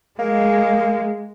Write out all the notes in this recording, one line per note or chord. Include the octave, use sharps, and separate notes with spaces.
G#3 A#3